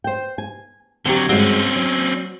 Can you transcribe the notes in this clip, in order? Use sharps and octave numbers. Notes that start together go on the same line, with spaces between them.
C5 G5
G#5
D3 F#3 C4 G4
G2 G#3 C4 C#4 F#4
F#3